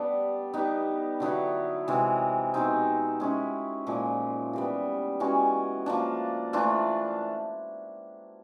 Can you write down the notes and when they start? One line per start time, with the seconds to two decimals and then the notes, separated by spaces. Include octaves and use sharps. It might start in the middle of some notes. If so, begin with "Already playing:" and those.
Already playing: G3 B3 D4
0.54 G3 B3 D#4 G4
1.20 D3 F#3 B3 E4
1.88 C3 E3 G#3
2.54 B2 G#3 C4 D#4
3.20 G#3 C#4 E4
3.87 A#2 F3 G#3
4.53 E3 G3 B3
5.20 E3 G#3 C#4 F#4
5.86 F3 A#3 D4
6.53 E3 A3 D4 F4